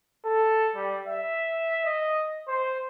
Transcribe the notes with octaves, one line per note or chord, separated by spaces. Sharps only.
A4
G3
E5
D#5
C5